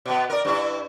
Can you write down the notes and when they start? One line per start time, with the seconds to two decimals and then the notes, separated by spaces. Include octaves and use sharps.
0.06 B2 B3
0.30 A#4 D5
0.45 G2 E4